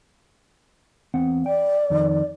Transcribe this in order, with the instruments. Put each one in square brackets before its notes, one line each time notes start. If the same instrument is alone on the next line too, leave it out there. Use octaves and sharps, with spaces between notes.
[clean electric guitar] E2 C4 F#5
[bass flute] D5 [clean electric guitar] G5
[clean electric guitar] F2 D#3